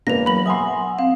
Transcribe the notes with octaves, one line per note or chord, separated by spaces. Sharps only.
E1 A#3 B4 A#6 F7
F#3 B5 F#7
E5 F#5 G#5 C6 D#6
C4 F5